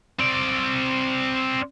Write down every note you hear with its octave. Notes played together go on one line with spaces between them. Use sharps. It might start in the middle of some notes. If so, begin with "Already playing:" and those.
C4 D5